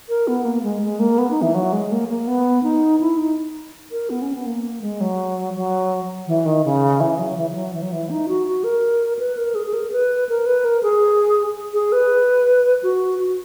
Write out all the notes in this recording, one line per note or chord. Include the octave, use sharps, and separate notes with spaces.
A#4
B3
A#3
G#3
G#3
A#3
B3
D#4
E3
F#3
G#3
A#3
A#3
B3
D#4
E4
D#4
A#4
B3
C#4
B3
A#3
G#3
F#3
F#3
E3
D#3
C#3
E3
F#3
E3
E3
F#3
E3
F#3
E3
D#4
F#4
F#4
A#4
B4
A#4
G#4
G#4
A#4
B4
A#4
B4
A#4
G#4
G#4
B4
F#4
F#4